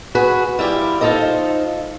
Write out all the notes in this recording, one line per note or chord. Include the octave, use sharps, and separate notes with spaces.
F#4 G#4 B4
G3 E4 F4 G4
D#4 F4 A4 C5 D#5